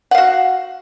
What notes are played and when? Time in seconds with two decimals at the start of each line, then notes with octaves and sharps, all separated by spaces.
0.11 F#5
0.15 F5
0.18 F#4